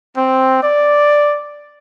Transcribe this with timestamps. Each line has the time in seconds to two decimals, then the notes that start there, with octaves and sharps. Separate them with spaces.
0.16 C4
0.62 D5